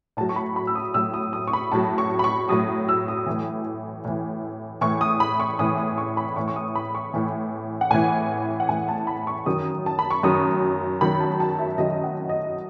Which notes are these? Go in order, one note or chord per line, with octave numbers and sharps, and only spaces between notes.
A2 F#3 A5
C#6
B5
B5
E6
D#6
A2 F#3 E6
D#6
D#6
C#6
B5
A2 F#3 A5
C#6
B5
C#6
A2 F#3 D#6
E6
D#6
A2 E3
A2 E3
A2 E3 C#6
D#6
B5
C#6
A2 E3 D#6
D#6
C#6
B5
A2 E3 C#6
C#6
D#6
B5
C#6
A2 E3
F#5
A2 E3 G#5
F#5
A2 E3 G#5
A5
B5
C#6
F#2 D#3 F#3 D#6
A5
B5
C#6
F#2 D#3 F#3 D#6
F#2 D#3 F#3 B5
A5
A5
E5
F#2 D#3 F#3 D#5
F#5
D#5